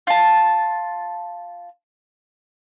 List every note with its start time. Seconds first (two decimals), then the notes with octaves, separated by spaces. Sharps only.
0.07 F4 A5